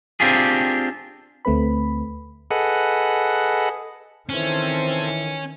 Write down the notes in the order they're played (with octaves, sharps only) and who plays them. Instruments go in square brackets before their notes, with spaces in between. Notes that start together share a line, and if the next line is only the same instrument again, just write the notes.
[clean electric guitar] C4 D4 F4 G4 G#4
[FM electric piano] D2 A3 C4 B4 B5
[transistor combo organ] G#4 A4 B4 D#5 F#5
[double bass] D#3 [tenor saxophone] E3 [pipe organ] C4 A4 C5 [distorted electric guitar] C#4